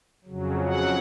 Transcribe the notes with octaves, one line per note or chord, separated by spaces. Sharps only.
F2 C#3 F#3
F#5